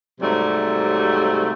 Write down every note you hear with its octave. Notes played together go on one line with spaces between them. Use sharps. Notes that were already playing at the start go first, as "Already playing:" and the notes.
G#2 C3 F#3 G3 A3